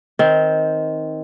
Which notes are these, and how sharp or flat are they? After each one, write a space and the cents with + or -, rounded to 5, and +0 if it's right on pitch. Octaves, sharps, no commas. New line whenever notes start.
D#3 +15 C4 +0